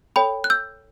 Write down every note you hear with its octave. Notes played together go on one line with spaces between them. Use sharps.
A4 C#5 G5 B5
F#6
E6 G6